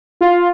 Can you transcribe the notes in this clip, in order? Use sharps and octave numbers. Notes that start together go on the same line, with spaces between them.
F4